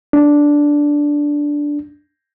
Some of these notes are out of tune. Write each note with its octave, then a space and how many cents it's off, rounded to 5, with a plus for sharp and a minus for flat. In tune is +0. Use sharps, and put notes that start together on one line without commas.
D4 -5